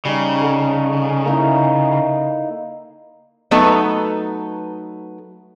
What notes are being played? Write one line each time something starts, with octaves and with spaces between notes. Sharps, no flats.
C#3 G3 D#4
A4 F#5
A#3 D#4 E4
F#3 A3 B3 D#4 A4 B4